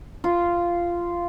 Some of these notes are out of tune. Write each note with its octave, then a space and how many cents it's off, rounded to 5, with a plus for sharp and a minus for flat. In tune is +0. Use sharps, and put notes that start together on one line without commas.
F4 -10